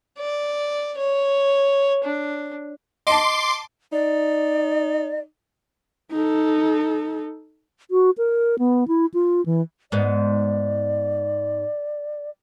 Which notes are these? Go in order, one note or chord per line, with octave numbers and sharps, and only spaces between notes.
D5
C#5
D4
D#5 A5 C6 D6
D#4 D5
D#4 A4
F#4
A#4
B3
E4
F4
E3
G#2 B3 D5